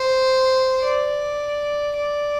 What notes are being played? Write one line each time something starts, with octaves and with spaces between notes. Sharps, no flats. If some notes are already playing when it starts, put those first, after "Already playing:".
Already playing: C5
D5
D5